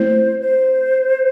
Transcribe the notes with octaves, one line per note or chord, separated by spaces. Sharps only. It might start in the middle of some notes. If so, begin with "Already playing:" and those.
Already playing: A3 C4 E4 C5
C5